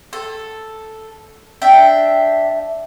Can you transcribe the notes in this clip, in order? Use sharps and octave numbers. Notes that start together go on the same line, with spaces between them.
A4
D4 E5 G5